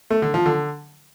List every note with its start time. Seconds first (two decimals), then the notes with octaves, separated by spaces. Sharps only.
0.10 A3
0.22 D3
0.34 F3
0.46 D3